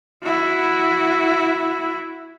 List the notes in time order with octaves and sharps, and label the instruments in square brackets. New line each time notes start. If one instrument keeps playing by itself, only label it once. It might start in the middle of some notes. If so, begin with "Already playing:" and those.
[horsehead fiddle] E4 F#4